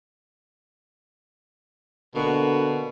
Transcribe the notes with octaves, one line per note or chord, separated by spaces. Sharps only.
B2 D3 A#3 F#4